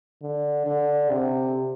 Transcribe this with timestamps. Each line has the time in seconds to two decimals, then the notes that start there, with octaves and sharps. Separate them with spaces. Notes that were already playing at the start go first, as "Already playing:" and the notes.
0.22 D3
0.66 D3
1.10 C3